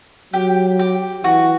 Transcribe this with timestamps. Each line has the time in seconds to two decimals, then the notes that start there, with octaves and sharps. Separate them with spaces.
0.33 F#3 G4
0.79 G4
1.24 E3 F#4